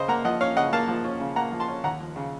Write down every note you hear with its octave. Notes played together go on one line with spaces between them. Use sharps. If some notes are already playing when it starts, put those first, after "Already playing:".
Already playing: C#3 C5 D#5
A#3 F#5 A#5
F3 D#5 F#5
C#4 C#5 F5
C#3 D#5 F#5
A#3 F5 A5
F3
C#4
C#3
A#3 F#5 A#5
F3
A5 C6
C#4
D#2 F#5 A#5
F3
C#3